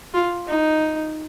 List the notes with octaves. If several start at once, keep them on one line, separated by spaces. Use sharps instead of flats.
F4
D#4